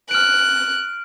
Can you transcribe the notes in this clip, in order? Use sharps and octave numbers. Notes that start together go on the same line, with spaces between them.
F6 F#6 D7